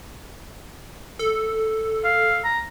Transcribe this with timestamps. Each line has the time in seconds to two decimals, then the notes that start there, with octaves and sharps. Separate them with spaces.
1.19 A4
2.04 F5
2.44 A#5